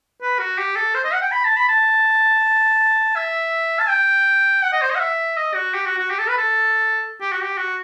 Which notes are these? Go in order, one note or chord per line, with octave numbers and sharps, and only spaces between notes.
B4
F#4
G4
A4
C5
D#5
F#5
G5
B5
A5
B5
A5
E5
A5
G5
F#5
D#5
C5
D#5
F#5
E5
D#5
F#4
G4
F#4
F#4
G4
A4
B4
A4
G4
F#4
G4
F#4